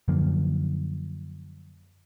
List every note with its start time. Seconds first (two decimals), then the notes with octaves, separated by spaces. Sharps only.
0.08 F#2 D3 F3 A#3